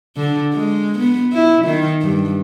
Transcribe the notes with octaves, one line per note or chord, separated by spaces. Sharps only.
D3
G#3
B3
E4
D#3
G2